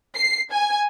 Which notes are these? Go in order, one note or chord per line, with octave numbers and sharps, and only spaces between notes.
C7
G#5